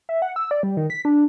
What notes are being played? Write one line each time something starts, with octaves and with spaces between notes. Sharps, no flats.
E5
F#5
E6
D5
G3
D#3
B6
D4